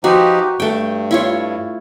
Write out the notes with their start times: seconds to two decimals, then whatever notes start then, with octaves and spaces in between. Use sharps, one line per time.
0.04 F3 D#4 F#4 G4 B4
0.60 G2 A3 G5
1.11 E4 F4 C#5